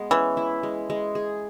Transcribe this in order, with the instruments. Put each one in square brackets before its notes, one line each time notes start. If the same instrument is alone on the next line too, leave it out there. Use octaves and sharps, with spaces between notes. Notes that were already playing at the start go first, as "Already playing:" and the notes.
Already playing: [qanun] G#3 B3
[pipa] E3 [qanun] C#4
[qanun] E4
G#3
G#3
G#4